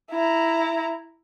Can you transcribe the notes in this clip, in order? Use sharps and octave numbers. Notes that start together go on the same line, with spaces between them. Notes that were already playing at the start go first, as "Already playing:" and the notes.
E4 A#5